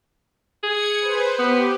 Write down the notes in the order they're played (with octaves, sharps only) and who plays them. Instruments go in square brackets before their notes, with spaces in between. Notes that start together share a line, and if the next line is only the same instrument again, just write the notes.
[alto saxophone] G#4 [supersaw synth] G#6 C#7
[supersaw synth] B4 C5
[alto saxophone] B3 [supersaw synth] G4